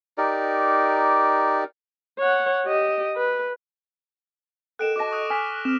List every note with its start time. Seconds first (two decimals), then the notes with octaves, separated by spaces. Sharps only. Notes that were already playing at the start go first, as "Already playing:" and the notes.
0.18 D#4 G4 A#4 D5
2.18 C#5 F#5
2.66 G4 D#5
3.17 B4
4.79 A4 A#4 D#5 F#5 G5 F#6 D7 E7
4.96 F#4 C#5 D#5 A5 D6 A#6
5.11 C#6 D#6 F#6
5.30 G#5 F6 F#6 B6
5.65 C4 F6 E7